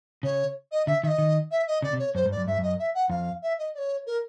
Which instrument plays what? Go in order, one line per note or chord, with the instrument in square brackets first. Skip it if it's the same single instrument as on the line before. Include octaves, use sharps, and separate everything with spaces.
[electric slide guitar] C#3 [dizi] C#5
[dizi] D#5
[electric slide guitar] D3 [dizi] E5
[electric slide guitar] D#3 [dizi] E5
[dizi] D#5
[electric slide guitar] D#3
[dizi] E5
D#5
[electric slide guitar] C#3 [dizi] D5
[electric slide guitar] C3
[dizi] C#5
[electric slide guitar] F#2 [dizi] C5
[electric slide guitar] G2
[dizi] D5
[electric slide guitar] F#2
[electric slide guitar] G2 [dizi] E5
[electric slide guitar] F#2 [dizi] D#5
[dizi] E5
F#5
[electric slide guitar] F2 [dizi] F5
[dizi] E5
D#5
D5
C#5
A#4